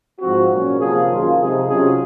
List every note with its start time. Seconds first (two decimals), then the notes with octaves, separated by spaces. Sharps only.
0.20 G#2 F3 C4 F#4
0.50 A#2 F#3 C#4
0.80 C3 F3 A#3 F4 G#4
1.08 F#2 D#3 A#3 F4 G#4
1.38 C3 F3 G#3 D#4 G#4
1.67 C3 F#3 C#4 F4 G#4